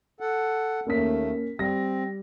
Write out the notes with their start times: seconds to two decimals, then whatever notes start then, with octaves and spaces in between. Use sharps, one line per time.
0.20 A4 F#5
0.87 D#2 A3 A#3 C#4 B6
1.59 G3 C4 A#6